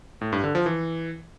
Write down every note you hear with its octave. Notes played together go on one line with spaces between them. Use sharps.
A2
G2
D3
F3
E3